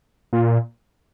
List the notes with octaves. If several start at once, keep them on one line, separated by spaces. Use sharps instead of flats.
A#2